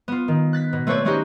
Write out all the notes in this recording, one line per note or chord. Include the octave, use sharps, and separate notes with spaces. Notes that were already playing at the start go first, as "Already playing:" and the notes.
B3 F4
D#3
F#6 A6 B6
B2
A3 C4 B4 C#5 D5
A3 C4 C#4 D#4 F#4 G4